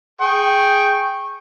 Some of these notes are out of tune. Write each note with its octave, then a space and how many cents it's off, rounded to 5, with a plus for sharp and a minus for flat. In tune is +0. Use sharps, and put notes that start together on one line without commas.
G#4 +0 G5 +0 C#6 -20